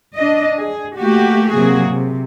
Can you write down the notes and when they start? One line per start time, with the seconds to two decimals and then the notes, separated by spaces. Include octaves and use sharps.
0.16 D4 D#5
0.59 G#4
0.99 A3 A#3 F#4 G4
1.51 C3 F#3 A#3 F#4 G#4
1.88 C3